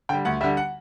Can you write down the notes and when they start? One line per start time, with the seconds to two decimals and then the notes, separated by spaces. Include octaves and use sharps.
0.09 D3 G3 G5
0.25 D2 F#5
0.41 D3 G3 E5
0.57 F#5